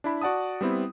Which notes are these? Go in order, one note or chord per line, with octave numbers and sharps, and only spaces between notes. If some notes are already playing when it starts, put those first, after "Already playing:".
D4 E4 B5
F#4 D5 F#5 A5 D#6
G3 B3 C4 E4